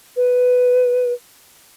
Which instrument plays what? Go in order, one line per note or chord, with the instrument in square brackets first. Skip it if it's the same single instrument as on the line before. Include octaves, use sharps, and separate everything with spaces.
[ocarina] B4